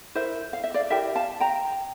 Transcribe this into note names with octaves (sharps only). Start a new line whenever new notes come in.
E4 A#4 C5 E5
F5
E5
D5 F5
E4 G4 A#4 E5 G5
F5 A5
G5 A#5